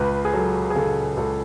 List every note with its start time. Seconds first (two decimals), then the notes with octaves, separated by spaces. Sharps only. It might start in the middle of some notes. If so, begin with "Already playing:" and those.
Already playing: C#2 B4
0.25 G#4
0.33 F#3 A4
0.70 G#4
0.75 C#3 A4
1.17 C#2 A4